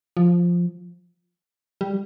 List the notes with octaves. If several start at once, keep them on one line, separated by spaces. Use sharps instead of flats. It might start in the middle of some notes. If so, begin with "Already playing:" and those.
F3
G3